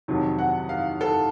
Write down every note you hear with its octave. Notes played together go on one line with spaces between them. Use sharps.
F2 C3 D#3 F#3
F#5
F5
A4